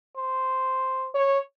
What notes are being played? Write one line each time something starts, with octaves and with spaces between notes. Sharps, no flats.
C5
C#5